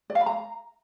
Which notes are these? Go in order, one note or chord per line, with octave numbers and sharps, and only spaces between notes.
D5
F5
B5
A#5